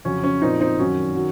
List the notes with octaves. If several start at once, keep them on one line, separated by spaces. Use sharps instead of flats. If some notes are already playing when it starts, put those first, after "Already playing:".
F2 C#3 F#3 C#4
C#4
A#2 F3 C4 D#4
C4 D#4
F#2 D#3 F#3 C#4
D#3 F#3